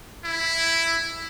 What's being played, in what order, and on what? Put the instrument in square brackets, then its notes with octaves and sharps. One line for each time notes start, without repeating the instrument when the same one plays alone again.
[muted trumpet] E4